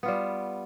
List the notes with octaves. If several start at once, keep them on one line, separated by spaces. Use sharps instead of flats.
G3 B3 F4